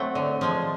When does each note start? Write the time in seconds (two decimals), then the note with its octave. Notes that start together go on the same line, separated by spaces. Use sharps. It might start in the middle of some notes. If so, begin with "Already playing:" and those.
Already playing: F#3 A3 C4
0.15 D3
0.41 F3 G#3